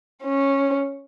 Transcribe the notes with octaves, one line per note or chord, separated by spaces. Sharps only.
C#4